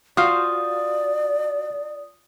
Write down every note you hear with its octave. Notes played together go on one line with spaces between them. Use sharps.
F4 F#4 C5 D5 F5 D#6